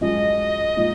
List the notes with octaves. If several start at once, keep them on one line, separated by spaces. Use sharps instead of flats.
F#2 F3 G#3 D#5
A#2 F3 G#3 D#4